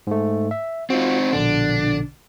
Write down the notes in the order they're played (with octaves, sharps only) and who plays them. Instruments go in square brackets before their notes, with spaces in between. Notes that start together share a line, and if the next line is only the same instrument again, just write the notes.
[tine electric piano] G#2 A3
E5
[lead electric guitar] C4 D#4 [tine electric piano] F4 F#4
[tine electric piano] A#1 B2 D3 [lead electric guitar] D4